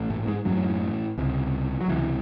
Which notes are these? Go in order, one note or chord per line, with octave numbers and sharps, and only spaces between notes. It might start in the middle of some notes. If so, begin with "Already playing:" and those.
Already playing: A1
A2 A3
G#2 G#3
A1 F#2 A2 F#3
C#2 C3
F#3
C#2 C3 E3